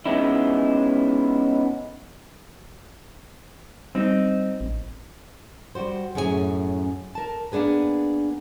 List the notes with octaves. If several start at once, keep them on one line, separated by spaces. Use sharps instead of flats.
G#3 B3 C#4 D#4 E4
G3 C4 D#4
A1
G3 F#4 C5
F#2 A2 C#4 G#4 A4 G#5
A#4 A5
A#3 B3 D4 G#4 B4